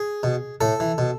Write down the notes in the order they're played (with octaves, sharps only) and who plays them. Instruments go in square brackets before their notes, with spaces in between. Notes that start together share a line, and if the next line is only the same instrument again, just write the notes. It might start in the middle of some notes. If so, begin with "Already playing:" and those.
Already playing: [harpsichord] G#4
B2
A2 A4
E3
B2